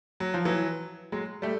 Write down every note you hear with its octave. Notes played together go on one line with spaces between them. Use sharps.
F#3
F3
E3 F#3
F#3 G#3
G3 A3